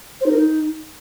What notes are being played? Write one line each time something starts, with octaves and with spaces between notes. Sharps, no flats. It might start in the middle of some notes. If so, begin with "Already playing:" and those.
C5
D#4
A#4
D#4